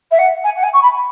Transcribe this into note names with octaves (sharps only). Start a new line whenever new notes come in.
E5
F#5
G#5
F#5
G#5
C#6
B5